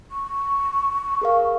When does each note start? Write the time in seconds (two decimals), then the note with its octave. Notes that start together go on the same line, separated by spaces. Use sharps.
0.11 C#6
1.22 G#4 A#4 F5